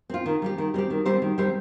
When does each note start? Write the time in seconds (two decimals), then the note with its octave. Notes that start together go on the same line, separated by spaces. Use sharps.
0.10 C4 F4
0.26 D#3
0.42 G3 C4 G4
0.58 D#3
0.74 G3 C4 G4
0.90 D#3
1.05 G3 C4 G4 C5
1.22 D#3
1.38 G3 C4 G4 C5